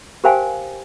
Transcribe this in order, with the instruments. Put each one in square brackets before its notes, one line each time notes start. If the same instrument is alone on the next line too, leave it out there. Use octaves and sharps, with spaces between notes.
[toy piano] G4 A#4 C5 F5 G5 G#5